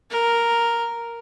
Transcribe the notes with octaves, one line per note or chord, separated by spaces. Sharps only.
A#4